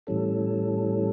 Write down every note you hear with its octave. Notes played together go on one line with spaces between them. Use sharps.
A2 E3 G3 C#4 A4